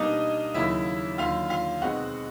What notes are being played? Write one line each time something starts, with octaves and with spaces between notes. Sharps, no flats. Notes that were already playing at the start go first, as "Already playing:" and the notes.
Already playing: B2 G3 A#3 D4 D#4 D#5
D#2 C#3 F#3 A#3 E4 E5
D#2 D3 F#3 F4 F5
F4 F5
B2 G#3 C4 D#4 F#4 F#5